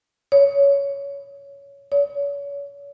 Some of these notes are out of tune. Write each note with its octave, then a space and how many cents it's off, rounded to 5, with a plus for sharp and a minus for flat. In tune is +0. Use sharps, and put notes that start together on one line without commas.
C#5 +15
C#5 +35